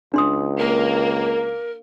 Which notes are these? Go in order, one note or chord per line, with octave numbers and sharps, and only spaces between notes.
C#2 D4 C6 D#6
A#3 A#4